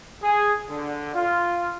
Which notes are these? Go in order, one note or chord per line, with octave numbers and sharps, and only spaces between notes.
G#4
D3
F4